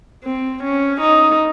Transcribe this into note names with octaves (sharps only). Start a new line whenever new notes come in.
C4
C#4
D#4